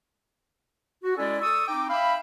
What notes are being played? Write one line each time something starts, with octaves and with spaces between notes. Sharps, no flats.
F#4
G#3 C#4 E4 A4 D5
A4 C#6 D#6 E6
C4 D#4 G5 D6
E5 F5 G5 B5